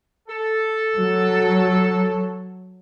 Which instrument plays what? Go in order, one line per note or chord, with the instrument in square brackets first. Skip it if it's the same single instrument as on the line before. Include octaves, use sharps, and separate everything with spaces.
[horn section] A4
[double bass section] F#3